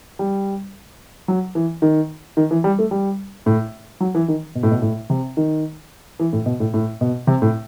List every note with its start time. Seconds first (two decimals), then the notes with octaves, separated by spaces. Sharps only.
0.19 G3
1.28 F#3
1.55 E3
1.82 D#3
2.37 D#3
2.51 E3
2.64 G3
2.79 A3
2.91 G3
3.46 A2
4.00 F#3
4.15 E3
4.28 D#3
4.55 B2
4.63 A2
4.71 B2
4.82 A2
5.10 C3
5.37 D#3
6.19 E3
6.33 A2
6.46 B2
6.60 A2
6.74 A2
7.01 B2
7.27 C3
7.42 A2